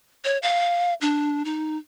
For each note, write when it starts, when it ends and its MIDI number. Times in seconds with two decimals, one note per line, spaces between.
0.24 0.38 73
0.42 0.94 77
1.01 1.43 62
1.45 1.77 63